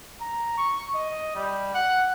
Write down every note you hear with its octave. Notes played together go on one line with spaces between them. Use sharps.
A#5
C#6
D#5
G3
F#5